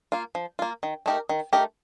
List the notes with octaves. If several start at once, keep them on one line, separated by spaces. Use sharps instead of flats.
A#3 F4
F3
A#3 F4
D#3
A3 D#4 G4 A#4
D#3
A3 D#4 G4 A#4